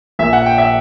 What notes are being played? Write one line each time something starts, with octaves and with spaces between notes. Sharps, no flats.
A#1 A#2 A#3 E5
F#5
G5
E5